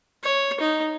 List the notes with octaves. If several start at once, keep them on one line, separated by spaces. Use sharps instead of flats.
C#5
D#4